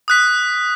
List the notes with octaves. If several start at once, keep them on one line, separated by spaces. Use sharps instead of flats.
D#6 F#6 B6